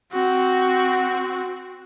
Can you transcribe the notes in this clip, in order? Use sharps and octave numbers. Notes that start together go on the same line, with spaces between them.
C4 F#4